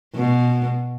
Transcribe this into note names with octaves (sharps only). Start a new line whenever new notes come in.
B2